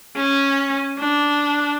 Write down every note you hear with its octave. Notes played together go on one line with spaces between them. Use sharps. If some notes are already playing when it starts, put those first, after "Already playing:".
C#4
D4